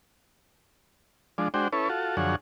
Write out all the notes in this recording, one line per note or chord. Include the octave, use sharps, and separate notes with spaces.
F3 G#3 D4
G#3 D4 F#4 C5 G5
C#4 E4 A4 B4 C#5
F4 F#4 A4
F#2 D3 F3 G#4 C#5 F#5